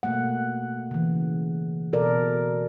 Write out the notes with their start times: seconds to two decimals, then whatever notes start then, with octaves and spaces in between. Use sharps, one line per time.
0.03 B2 A3 A#3 F#5
0.91 C#3 E3
1.93 B2 A4 A#4 D5